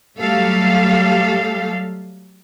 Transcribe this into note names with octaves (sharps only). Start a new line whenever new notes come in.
F#3 G3 A3 G4 A4 F5